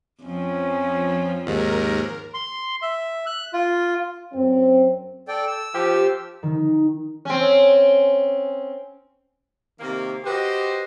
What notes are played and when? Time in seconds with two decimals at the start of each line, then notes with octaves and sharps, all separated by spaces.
0.22 F2 F3 C#4
1.46 D#2 G#2 A#4
2.34 C6
2.82 E5
3.26 F#6
3.53 F4
4.33 F#2 F#3 C4
5.28 A4 D5 G5
5.47 E6
5.74 F3 G4
6.43 D#3
7.25 C4 C#4
9.80 C3 D#3 A#3
10.24 F#4 G4 B4 C5 D#5